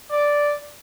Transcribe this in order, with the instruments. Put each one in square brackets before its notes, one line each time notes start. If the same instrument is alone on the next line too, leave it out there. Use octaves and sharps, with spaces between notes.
[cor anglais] D5